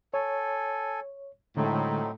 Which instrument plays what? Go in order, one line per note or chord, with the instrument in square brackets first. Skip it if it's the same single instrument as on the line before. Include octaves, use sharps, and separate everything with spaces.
[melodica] A4 G#5 [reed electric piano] C#5
[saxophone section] A2 [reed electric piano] D3 G#3 [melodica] F#3 C4 D#4